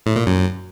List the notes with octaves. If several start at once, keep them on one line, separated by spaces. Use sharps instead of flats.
A2
A#2
F#2